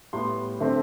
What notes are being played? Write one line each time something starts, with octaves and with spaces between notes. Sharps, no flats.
A2 G3 B3 C6
D3 A3 C4 E5